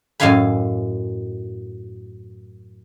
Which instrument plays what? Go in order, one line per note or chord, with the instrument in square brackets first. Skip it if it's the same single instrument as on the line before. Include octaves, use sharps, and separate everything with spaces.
[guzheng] F#2 A2 D#5 F5 G#5 B5